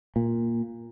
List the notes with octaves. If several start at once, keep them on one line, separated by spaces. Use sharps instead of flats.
A#2